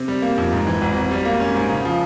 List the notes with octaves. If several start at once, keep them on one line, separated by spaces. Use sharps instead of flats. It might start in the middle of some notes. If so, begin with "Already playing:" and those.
Already playing: C3
G3
A#3
F2
G#2
E3
G#1
G#1
G3
A#3
C#4
G#2
C#3
F3